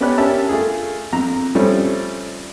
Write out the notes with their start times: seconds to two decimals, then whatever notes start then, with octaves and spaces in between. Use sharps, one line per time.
0.01 B3 C#4 G4 D5 B5 F#6
0.18 C#4 G4 A#4 E5 A5
0.49 A3 F4 G#4
1.13 F2 A#5
1.55 F3 G3 A3 C4 C#4